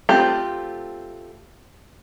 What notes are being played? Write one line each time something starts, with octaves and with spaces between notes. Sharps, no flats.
A3 C4 F4 G4